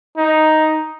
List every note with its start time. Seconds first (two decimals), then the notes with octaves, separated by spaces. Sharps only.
0.17 D#4